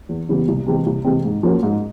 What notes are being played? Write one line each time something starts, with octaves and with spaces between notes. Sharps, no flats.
E2
C#3 E3 G3 B3
C2
C3 E3 G#3 C4
C2
C3 E3 G#3 C4
G#2
F3 A#3 C#4 F#4
G#2